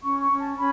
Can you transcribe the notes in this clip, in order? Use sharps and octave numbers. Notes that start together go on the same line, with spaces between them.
C#4 C#6
C#6
C#4
A5
C#4 B5